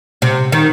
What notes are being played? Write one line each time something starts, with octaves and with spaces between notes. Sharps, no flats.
C3
D#3